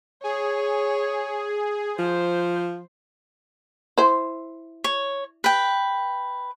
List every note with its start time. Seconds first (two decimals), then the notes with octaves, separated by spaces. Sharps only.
0.24 G#4 C#5
1.99 F3 C5
3.98 E4 C5
4.84 C#5
5.44 B4 G5